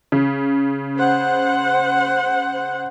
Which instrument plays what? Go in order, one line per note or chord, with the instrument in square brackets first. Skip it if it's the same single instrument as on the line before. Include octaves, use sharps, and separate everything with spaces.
[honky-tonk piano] C#3
[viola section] C5 F#5